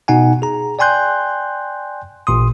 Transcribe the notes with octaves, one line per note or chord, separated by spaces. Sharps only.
B2 D#4 F#5 G#5
G#4 A#5
D5 G5 G#5 C6 F#6 G6
A1 A#2 C6 D#6